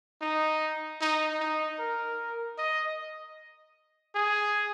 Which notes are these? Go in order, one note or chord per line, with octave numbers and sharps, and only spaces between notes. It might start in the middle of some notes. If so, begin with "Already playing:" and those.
D#4
D#4
D#4
A#4
D#5
G#4